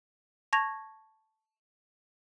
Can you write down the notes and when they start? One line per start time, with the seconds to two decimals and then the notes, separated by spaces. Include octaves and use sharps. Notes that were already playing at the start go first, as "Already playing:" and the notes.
0.53 A5 C#6 G#6 A#6 F7